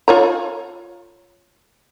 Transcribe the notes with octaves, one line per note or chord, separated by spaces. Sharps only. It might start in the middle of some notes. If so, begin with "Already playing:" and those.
F4 C#5 A#5